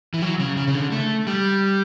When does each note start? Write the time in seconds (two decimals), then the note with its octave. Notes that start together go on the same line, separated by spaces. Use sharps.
0.14 E3
0.22 F#3
0.40 C#3
0.57 C#3
0.67 C#3
0.75 D3
0.92 A3
1.27 G3